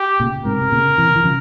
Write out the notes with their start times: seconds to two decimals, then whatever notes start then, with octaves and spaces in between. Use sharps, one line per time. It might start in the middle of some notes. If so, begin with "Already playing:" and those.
Already playing: G4
0.20 A#2 C#3
0.45 G#2 C3 A#4
0.61 C3
0.71 A#2 C#3
0.98 C3 E3
1.16 E3
1.24 C#3 F3